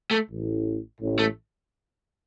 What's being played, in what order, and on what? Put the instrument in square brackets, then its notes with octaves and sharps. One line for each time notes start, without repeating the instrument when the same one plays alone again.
[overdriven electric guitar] A3
[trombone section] A1 A2
A1 A2
[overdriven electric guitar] A3